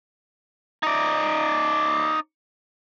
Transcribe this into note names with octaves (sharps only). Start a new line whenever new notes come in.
D#4 D5